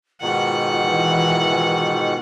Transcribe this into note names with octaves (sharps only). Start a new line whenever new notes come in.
G#2 B2 D#3 F4 F#5
E3